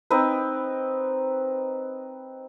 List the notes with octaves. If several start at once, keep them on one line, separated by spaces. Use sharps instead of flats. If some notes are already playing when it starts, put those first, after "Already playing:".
C4 D#4 B4